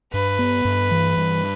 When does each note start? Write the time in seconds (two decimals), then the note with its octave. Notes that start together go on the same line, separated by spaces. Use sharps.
0.13 G2 B4
0.39 B3
0.65 G2
0.91 E3
1.17 G2